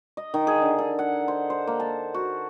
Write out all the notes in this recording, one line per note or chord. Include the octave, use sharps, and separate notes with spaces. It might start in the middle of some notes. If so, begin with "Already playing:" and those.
D#5
D#3
G#4
D3
A4
F#5
C5
C5
A#3
A5
F#4